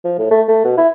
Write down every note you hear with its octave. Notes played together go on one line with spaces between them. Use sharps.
F3
A2
A3
A3
B2
E4